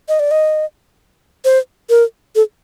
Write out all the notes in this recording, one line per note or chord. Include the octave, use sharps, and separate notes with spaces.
D#5
D5
D#5
C5
A#4
A4